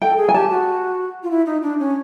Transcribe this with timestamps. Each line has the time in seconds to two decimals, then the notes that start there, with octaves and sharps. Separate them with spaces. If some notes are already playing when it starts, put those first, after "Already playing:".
0.02 A4 G5
0.17 G#4
0.29 G#5
0.34 G4 A5
0.50 F#4
1.23 F4
1.31 E4
1.46 D#4
1.63 D4
1.79 C#4